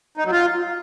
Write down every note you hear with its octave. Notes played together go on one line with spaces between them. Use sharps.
D#4
F#3
F4